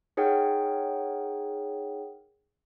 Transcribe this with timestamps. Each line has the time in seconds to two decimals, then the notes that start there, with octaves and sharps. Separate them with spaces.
0.17 D#4 G#4 A#4 C#5 F#5 G5